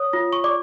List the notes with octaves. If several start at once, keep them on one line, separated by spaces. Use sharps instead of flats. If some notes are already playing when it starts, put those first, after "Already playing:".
Already playing: C#5 D#6
F4
C#6
D5 D6